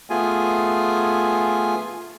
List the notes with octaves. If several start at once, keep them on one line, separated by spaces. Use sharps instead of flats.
A3 B3 F4 G#4 G#5